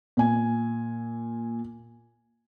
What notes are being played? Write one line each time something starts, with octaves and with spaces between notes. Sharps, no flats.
A#2 G#5